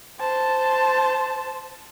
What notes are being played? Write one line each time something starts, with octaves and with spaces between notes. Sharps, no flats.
C5 A5